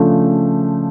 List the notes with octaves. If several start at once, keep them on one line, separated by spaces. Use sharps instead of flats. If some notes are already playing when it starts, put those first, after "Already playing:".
Already playing: C#3 F3 A3 D4